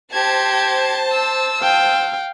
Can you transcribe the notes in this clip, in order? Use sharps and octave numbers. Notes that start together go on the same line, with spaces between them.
G4 C5 A5 G#6
E6
F5 G5